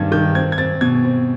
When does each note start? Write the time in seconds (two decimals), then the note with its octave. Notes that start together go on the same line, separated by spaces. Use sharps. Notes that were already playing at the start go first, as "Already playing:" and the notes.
Already playing: G2 D#3 C4 G#6
0.12 D#3 G6
0.35 C4 G#6
0.52 G#6
0.58 C4 A6
0.81 B2 G#6
1.05 C4